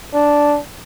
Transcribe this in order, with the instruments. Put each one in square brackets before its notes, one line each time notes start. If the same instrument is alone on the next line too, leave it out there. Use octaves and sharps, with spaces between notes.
[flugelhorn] D4